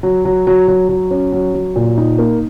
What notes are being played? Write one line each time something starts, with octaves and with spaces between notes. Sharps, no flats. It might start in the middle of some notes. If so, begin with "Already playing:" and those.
F#3
F#3
F#3
F#3
F#3
C#4
F#3
F#3
A#2
D#4
A#3